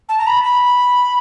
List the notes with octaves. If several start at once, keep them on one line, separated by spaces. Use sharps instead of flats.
A5
A#5
B5
B5